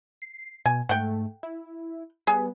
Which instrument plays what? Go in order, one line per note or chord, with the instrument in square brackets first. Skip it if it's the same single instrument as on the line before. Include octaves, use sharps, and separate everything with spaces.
[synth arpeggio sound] C7
[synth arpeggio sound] B2 [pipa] G#5
[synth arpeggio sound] G#2 A3 [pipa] F#5 G5
[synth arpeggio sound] E4
[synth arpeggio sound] G3 B3 [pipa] G#4